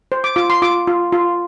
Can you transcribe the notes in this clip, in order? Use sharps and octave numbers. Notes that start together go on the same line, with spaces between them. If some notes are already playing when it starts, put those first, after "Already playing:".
C5
D6
F4 D6
C6
F4 D6
F4
F4